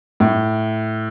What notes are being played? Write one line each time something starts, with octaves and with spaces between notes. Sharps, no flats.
A2